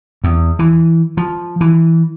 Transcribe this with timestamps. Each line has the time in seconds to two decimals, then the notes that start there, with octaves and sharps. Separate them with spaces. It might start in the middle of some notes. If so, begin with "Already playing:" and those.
0.24 E2
0.59 E3
1.17 F3
1.61 E3